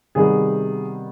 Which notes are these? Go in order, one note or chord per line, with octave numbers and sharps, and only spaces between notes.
C3 D#3 G3 B3 G#4